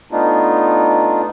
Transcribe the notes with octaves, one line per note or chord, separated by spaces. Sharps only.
A3 B3 D4 D#4 F4